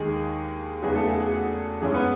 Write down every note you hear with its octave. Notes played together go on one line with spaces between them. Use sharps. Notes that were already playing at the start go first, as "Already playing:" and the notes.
Already playing: D#2 D#3 G#3 G#4
E2 C#3 F#3 B3 D#4 G#4
A3 A4
G#4
G#4
F#4
F#2 E3 G#3 C#4 G#4
B3 B4